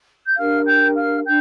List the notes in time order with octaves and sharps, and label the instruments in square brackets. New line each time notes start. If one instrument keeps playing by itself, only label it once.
[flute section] G6
D4 G4 A#4 F5 F6
G5 G6
F5 F6
D4 G5 G6